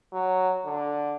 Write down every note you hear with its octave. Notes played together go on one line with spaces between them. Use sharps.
F#3
D3